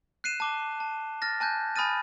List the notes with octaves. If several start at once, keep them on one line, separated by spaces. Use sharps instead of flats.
F#6 C7 D#7 E7
A5 D6 G7
A5
F6 A6 A#6
G#5 A5 F#6 G6
G#5 B5 D#6 F6 A6 D#7